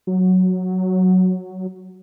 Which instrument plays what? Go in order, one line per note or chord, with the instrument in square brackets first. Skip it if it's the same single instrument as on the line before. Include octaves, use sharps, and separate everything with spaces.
[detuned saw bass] F#3